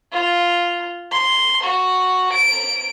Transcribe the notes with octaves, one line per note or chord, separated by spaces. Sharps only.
F4
C6
F#4
D7